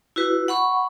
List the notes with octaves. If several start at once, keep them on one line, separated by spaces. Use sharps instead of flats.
E4 F#4 B4
F#5 B5 C#6